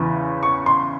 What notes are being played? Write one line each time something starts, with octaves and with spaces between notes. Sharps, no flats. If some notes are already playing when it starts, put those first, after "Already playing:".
Already playing: E2 C#3 E3
C#6
C6